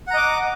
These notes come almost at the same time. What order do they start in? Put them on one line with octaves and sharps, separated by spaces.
F#5 A#5 D#5 D6